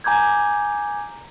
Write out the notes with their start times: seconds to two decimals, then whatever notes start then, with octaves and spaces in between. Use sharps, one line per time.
0.04 G#5 A#5 D6 G6 G#6